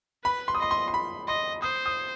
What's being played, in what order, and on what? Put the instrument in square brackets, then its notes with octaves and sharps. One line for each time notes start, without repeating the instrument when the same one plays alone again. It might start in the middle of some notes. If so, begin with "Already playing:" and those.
[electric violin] B4 [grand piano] B5
[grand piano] C6
D#6
[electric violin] D#5 [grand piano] C6
[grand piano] C6
C6
B5
[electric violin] D#5 [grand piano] C6
[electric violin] C5 [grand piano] D#6
[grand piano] D#6